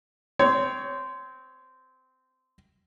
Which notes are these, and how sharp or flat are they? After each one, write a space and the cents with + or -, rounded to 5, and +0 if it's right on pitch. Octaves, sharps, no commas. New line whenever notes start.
C4 -15 C#5 +5